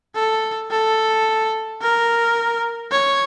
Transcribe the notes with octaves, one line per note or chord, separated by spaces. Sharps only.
A4
A4
A#4
C#5